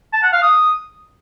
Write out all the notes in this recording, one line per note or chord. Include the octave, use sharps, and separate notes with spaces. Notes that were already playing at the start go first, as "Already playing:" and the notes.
A5
F#5
F5
D#6